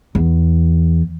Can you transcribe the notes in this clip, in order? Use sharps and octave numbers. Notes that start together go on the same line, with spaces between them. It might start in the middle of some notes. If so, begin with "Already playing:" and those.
E2